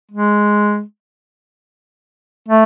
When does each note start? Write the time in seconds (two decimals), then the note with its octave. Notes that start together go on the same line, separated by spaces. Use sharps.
0.11 G#3
2.48 A3